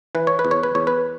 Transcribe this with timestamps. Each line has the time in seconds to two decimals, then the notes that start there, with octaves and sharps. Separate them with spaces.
0.15 E3 B4
0.27 C#5
0.39 B4
0.45 E2
0.51 C#5
0.63 B4
0.75 E2 C#5
0.87 B4